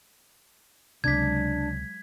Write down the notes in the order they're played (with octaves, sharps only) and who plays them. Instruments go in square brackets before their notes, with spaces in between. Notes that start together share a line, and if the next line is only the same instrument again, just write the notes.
[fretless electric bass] C#2 C3 [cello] F#3 G#3 [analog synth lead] D4 [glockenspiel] G#6 B6